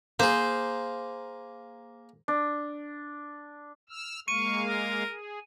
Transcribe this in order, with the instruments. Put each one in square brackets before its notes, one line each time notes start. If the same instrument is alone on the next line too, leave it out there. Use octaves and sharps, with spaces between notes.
[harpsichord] A#3 G#4 [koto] C5
[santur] D4
[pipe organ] E6 F6
[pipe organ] G#3 A#3 F5 [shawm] C#6 [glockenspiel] D#7
[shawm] A#4
[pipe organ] G#4